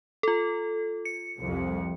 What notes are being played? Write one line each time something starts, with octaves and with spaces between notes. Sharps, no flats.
F4 A4
C#7
C2 F2